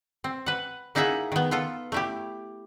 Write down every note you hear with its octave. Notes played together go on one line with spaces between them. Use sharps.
C4
B4 F#5
A#3 D#4 E4 G#4 E5 F#5
D#3 B3
B3 F4 A4
A3 E4 G4